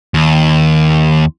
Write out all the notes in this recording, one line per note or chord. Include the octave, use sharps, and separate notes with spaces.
D#2